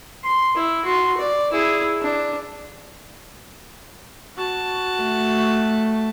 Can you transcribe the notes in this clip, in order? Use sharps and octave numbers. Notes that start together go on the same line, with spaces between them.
C6
E4
F#4 C6
D5
E4 G#4
D4
F#4 A5
A3